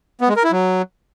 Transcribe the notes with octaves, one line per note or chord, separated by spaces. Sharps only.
B3
G#3
A#4
E4
F#3